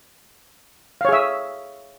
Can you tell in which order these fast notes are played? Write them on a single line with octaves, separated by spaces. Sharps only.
F5 C#5 G#4 E5